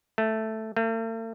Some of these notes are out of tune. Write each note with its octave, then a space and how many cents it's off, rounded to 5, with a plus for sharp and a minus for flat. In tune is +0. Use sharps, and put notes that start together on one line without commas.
A3 +0
A3 +45